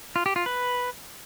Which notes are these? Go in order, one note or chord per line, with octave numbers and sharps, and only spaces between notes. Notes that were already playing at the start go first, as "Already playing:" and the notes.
F4
G4
F4
B4